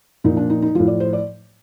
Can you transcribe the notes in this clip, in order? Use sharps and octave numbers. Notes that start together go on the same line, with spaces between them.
A#2 F3 D#4
D4
D#4
D#4
A2 F3 F4
D5
C5
D5